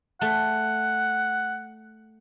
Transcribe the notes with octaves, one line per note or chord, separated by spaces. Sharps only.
A3 F#5